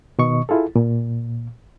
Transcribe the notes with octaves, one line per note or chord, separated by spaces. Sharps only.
B2 D#3 D#5 C#6
E4 F4 G#4 A4
A#2